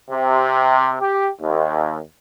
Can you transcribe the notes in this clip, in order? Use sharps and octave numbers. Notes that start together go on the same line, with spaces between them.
C3
G4
D#2